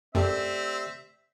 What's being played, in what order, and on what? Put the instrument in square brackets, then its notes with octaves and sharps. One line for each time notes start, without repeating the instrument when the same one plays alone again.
[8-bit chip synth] F#2 [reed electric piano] A3 G4 D5 [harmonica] C4 E5